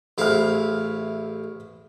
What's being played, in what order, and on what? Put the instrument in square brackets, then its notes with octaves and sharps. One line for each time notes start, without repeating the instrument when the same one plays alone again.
[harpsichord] A1 E4 F5 [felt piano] G#4 C5 F6